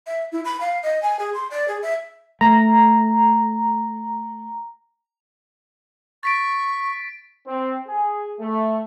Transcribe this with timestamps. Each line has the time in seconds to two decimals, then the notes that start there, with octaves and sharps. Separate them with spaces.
0.07 E5
0.32 E4
0.45 B5
0.61 F5
0.83 D#5
1.02 G#5
1.19 G#4
1.34 C6
1.51 D5
1.68 G#4
1.83 E5
2.41 A3 A#5
6.23 C#6 A6 B6 D7
7.46 C4
7.88 G#4
8.39 A3